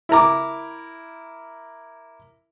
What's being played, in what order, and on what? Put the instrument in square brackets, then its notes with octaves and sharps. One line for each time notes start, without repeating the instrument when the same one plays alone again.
[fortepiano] E4 A#4 A#5 D6